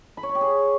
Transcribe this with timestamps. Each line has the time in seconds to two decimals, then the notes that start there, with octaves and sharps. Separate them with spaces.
0.17 B5
0.23 C#5
0.29 B5
0.35 G4
0.41 G#4